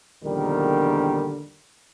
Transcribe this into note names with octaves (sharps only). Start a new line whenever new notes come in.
A#1 E2 D3 D#3 G3 A#4